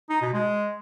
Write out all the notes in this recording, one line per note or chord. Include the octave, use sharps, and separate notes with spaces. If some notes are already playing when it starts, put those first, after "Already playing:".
D#4
B2
G#3